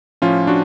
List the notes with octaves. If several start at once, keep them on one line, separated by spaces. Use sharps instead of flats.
A2 F3 C#4 F4
D4 F#4